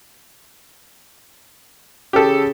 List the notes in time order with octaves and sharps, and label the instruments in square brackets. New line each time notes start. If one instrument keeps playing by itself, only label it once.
[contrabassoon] C#3 [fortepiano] G4 A4